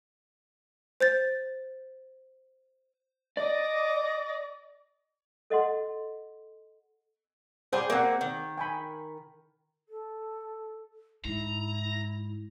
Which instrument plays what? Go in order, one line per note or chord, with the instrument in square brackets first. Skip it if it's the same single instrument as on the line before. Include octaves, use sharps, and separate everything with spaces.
[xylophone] C5 G6 A6
[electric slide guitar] D5 [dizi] D#5 [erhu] D6
[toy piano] A4 D#5 F#5 C6
[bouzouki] G3 G4 G#4 [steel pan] C5 G5 G#5
[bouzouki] A#3 C4 [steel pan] G#4 F#5
[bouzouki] D#3
[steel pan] G5 G#5 B5
[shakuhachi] A4
[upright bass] G#2 [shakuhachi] E4 [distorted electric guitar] A#5